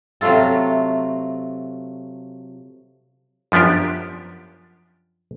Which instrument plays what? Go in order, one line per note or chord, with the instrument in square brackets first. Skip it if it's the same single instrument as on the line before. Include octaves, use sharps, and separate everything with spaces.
[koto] C3 F#3 A3 F4 A4
[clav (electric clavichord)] F#2 F3 B3 D4 G4